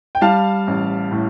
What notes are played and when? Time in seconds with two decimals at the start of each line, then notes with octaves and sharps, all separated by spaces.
0.15 G5
0.21 G3 F5 A5
0.67 A1
1.12 A2